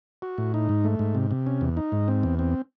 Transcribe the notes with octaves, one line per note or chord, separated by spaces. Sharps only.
F#4
A2
D#4
G#2
A3
G#2
C3
C3
C#4
E2
D#4
G#2
C4
E2
C4